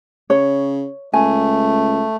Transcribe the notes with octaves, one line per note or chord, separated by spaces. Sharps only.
C#3 C#5
C#2 A3 G#5